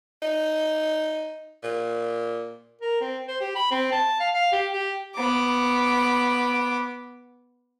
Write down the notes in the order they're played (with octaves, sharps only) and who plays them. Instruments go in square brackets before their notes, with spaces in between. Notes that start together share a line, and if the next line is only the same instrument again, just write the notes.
[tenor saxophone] D#4
A#2
[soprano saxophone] A#4
C4
C5
G4
B5
C4
A5
F5
F5
G4
G4
[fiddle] B3 D6